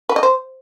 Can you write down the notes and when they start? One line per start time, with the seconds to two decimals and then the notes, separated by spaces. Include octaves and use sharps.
0.09 B4
0.16 D#5
0.23 C5